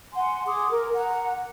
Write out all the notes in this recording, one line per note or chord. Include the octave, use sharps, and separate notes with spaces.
F#5 G#5 C6
G#4 C6 D6 D#6
A#4
F#5 A#5